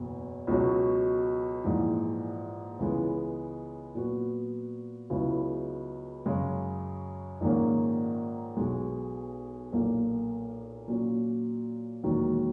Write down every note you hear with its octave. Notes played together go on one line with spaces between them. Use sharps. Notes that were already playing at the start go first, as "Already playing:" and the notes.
Already playing: F#1 E2 B2
C#2 B2 F#3 C#4 F#4
A#1 G#2 E3
C#2 C#3 E3 G#3 B3
A#2 F#3 B3 F#4
C#2 C#3 F#3 B3 E4
F#2 C#3 G#3
A#1 G#2 D#3 A#3 C#4
B1 B2 G#3
B1 A#2 A#3
A#2 F#3 C#4
E1 D#2 D#3 F#3